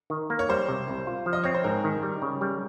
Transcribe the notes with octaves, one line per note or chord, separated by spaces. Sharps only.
D#3
A#3
C#5
G3 C5
C3
C2
F4
F3
D#5
C4 C#5
C5
G#2 A#4
D#3
G3
C#3
G3